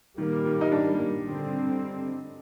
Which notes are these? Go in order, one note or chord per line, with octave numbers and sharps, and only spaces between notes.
A#2 D#3 G3 A#3
D#3
D#4
D4
D3 G3 C4